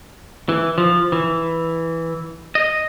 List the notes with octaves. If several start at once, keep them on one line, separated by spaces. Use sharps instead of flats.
E3
F3
E3
D#5